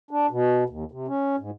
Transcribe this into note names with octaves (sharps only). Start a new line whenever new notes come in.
D4
B2
D#2
C3
C#4
G#2